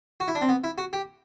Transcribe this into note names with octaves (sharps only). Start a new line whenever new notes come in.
F#4
E4
D4
C4
B3
E4
F#4
G4